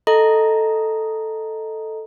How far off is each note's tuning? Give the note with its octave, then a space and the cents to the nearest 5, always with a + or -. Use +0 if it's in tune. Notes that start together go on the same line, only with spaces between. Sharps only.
A4 +0 D#5 +0 A#5 +0